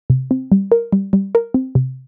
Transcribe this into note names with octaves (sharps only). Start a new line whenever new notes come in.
C3
C4
G3
A#4
G3
G3
A#4
C4
C3